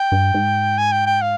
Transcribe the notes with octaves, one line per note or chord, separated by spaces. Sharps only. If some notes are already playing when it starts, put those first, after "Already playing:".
Already playing: G5
G2
G#2
G#5
G5
G5
F5